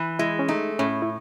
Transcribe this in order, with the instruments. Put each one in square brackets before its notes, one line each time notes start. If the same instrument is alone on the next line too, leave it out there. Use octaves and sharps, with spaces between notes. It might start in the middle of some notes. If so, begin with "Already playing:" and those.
Already playing: [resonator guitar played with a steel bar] E3
[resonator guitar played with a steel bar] G#3 [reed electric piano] E4
[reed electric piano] C#4
[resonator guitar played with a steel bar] A3 [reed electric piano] D#4
[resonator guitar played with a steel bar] A2 [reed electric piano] C#4
[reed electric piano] E4